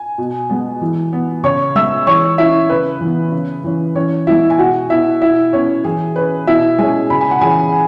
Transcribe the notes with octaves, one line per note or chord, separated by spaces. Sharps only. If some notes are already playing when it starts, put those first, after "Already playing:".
Already playing: G#5
B2
G#3 B3
E3
B3
C#3 C#5 C#6
G#3 B3 E5 E6
E3 C#5 C#6
C#4 E4 E5
C#3 B4
E3
B3
C#3
E3 C#4
E3 C#4 C#5
G#3 B3 E4 E5
G#5
B2 F#4 F#5
B3 E4 E5
B2 E4 E5
B3 C#4 C#5
E3 G#4
C#4 B4
B2 E4 E5
G#3 C#4 G#4 G#5
C#3 B5
G#5
F#5
E3 C#4 G#4 G#5